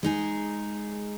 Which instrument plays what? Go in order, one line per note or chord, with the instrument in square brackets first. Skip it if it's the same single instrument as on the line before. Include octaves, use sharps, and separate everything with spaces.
[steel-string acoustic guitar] G#3 D#4 G#4